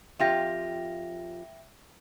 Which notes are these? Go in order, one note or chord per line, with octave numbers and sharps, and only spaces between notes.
F2 F4 G4 E5 G5 A#6